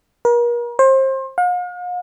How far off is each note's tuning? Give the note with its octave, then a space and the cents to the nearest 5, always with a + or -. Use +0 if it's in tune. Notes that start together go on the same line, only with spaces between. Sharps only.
A#4 +40
C5 +30
F5 +45